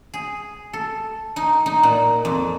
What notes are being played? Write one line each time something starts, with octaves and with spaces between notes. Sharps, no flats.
G#4
A4
D#4
D#4
A#2
F2